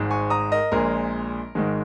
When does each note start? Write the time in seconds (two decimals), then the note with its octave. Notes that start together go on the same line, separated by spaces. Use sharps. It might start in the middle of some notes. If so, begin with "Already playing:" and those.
Already playing: G#1 G#2 G#3
0.10 G#5 C#6
0.30 A#5 D#6
0.52 A#4 D#5
0.72 A#1 A#2 G#3 A#4
1.55 G#1 G#2 D#3 G#3